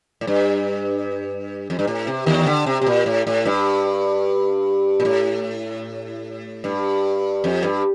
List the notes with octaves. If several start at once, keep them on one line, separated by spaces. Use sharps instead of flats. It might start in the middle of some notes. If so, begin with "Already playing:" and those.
A2
G2
F2
G2
A2
C3
D#2 D#3
D3
C3
C3
A#2
A2
A2
G2
A#2
A2
G2
F2
G2